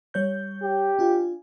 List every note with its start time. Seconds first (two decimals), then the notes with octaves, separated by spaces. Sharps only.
0.14 G3 C#5 G6
0.63 G4
0.99 D4 F4 G#5